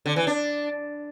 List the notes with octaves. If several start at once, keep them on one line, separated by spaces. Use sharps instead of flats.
D3
E3
D4